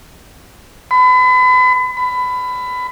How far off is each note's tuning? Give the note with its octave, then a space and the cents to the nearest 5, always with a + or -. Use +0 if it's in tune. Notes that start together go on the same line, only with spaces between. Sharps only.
B5 +35
B5 +20